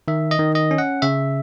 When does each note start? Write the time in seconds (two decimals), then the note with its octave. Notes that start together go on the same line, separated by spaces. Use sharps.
0.08 D#3 E5
0.31 D#5
0.39 D#3
0.55 D#5
0.71 C#4
0.78 F#5
1.02 C#3 E5